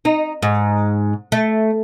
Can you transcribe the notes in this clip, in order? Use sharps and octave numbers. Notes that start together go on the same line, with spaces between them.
D#4
G#2
A3